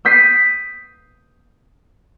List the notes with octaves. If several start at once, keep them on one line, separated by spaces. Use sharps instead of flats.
D#6 G6 B6 C7 D#7